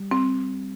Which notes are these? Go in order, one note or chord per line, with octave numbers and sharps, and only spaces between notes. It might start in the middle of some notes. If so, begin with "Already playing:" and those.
Already playing: G3
C4